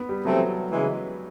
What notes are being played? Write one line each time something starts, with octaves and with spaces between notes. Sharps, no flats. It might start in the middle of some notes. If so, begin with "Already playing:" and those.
Already playing: B3
G3
C3 E3 F#3 A3 C4
C#3 E3 G#3